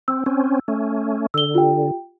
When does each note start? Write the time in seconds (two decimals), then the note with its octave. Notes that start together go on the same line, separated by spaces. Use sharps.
0.08 C4 E6
0.26 C4 C#4
0.68 A3 C#4
1.34 D3 E6 G7
1.55 F4 G4 G5